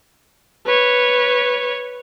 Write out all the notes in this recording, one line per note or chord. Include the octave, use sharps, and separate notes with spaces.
B4 C#5